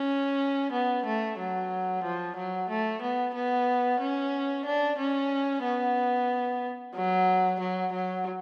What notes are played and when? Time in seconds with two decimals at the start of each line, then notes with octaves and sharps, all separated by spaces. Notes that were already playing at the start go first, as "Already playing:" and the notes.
Already playing: C#4
0.72 B3
1.05 A3
1.38 F#3
2.03 F3
2.36 F#3
2.69 A3
3.02 B3
3.34 B3
4.00 C#4
4.65 D4
4.98 C#4
5.64 B3
6.95 F#3
7.60 F#3
7.93 F#3